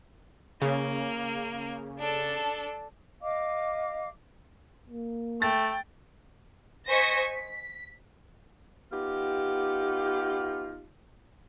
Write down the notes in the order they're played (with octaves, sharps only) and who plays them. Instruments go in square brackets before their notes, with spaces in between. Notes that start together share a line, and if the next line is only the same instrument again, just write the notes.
[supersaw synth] C#3 [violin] A#3
[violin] D4 A4
[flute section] D#5 F5 D6
[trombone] A#3
[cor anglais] A3 [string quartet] G5 [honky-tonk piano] A6
[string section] C5 D#5 G#5 C#6 A#6 B6
B6
[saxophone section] B3 D#4 F4 G4